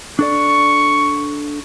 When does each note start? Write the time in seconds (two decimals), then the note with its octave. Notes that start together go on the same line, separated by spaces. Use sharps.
0.19 D4 A4 D5 C#6